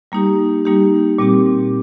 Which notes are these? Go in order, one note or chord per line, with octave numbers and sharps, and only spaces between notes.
G3 A#3 D#4 G4
G3 A#3 D#4 G4
A#2 G3 C4 G4